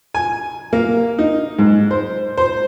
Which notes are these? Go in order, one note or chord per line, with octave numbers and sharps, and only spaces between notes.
G#5
A#3
D#4
G#2
C5
C5